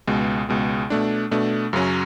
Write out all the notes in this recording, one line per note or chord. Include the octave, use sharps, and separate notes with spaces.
C#2 B2 G#3
C#2 B2 G#3
B2 A3 D4
B2 A3 D4
F#2 C#3 F#3 C#4